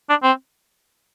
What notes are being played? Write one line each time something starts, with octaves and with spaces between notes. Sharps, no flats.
D4
C4